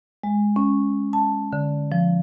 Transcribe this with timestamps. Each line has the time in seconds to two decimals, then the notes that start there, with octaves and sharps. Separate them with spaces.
0.24 G#3
0.56 C#4
1.13 A5
1.53 D3
1.92 F3